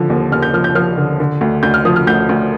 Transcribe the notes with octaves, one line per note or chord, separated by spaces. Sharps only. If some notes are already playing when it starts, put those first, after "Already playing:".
Already playing: D3 F3
D#2
D#2 F6
G6
F3 F6
G6
F3 F6
D3
D3
D2
D2 G6
F6
F3 D#6
F6
D2 G6
D2